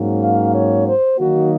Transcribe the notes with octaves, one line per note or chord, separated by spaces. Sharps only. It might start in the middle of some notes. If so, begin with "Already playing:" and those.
Already playing: G#2 F#3 A#3 C#4
F5
C#5
C5
D#3 F#3 A#3 D#4 F#4